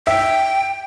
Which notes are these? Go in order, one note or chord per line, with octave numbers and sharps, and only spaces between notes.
E5 G5